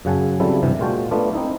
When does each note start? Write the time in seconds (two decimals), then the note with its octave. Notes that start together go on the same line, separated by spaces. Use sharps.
0.05 F#2 C#3 F#5 G#5 A5
0.40 C#3 F#3 G3 C4 E4 A4
0.63 G2 C3 E3
0.79 A#2 G#3 F4 F#4 G5 A5
1.11 A3 B3 D4 F4
1.33 C4 D#4 E4